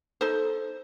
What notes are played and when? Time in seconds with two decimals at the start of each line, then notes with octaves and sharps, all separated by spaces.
0.21 D#4 A4 C5